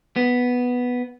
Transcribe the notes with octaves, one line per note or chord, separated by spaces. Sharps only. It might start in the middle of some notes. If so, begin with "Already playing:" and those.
B3